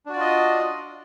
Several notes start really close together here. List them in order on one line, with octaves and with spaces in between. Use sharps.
D4 F#4 D5 F4 D#5